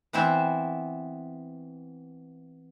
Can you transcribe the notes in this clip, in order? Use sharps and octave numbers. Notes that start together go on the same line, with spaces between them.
E3 B3 C4 E4 C5 E5